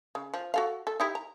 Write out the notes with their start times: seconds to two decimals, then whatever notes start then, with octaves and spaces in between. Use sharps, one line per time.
0.15 C#3
0.34 F3
0.54 F#4 A4 F5
0.87 A4
1.00 D#4 E4 G4
1.15 A#5